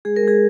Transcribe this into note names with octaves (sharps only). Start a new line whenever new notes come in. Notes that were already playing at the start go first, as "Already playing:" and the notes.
G#3 G#4
A#4
G#3 G#4